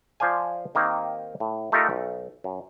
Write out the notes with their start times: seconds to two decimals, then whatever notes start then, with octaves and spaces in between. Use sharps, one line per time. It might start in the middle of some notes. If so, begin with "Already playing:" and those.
0.20 F3 C5 D5 F5 G#5
0.75 D#3 A#3 C4 D#4 G4
1.40 A2
1.72 A3 D#4 F4 G4 A4 A#4
1.90 B1
2.44 F#2